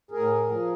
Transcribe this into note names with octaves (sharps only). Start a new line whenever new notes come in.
A2 G#4 A#4
F3